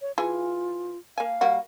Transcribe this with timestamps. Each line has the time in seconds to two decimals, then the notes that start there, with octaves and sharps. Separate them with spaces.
0.02 C#5
0.18 E3 F4 G#4
1.18 A#3 F5 G#5
1.41 G3 A#3 F#4